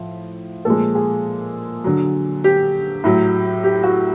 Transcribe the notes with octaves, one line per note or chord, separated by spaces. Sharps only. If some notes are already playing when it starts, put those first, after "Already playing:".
Already playing: A2 F3
A#2 F3 G#3 A4
G#4
D3 F#3
G4
A2 F#3
G4
F#4